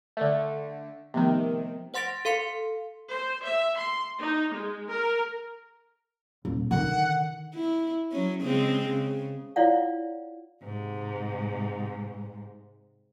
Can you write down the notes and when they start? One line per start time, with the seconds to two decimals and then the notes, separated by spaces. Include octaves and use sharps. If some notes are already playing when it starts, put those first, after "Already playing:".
0.17 D3 A3
1.14 C3 D#3 F3 A3 B3
1.94 C5 F#5 C6 A6 A#6 D7
2.25 A4 F5 C6 C#7
3.12 C5
3.46 E5
3.78 C6
4.21 D#4
4.52 G#3
4.88 A#4
6.45 D#1
6.71 D3 D#3 F#5
7.54 E4
8.11 F#3 C#4
8.42 C#3 G#3 C4
8.89 C#3
9.56 E4 F4 C#5 D5 F5 F#5
10.63 G#2 C3